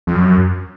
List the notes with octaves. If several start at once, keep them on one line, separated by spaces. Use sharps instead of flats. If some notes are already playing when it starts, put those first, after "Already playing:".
F2
F#2